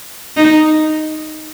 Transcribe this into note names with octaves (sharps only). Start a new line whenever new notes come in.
D#4